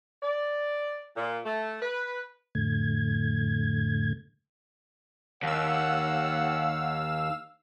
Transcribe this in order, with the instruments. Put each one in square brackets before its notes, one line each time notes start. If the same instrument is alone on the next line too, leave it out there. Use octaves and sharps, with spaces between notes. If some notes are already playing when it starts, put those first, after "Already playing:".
[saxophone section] D5
A#2
A3
B4
[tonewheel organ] F2 A2 D3 A3 G#6
[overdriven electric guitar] D#2 [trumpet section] C#5 F#5 [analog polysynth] F5 E6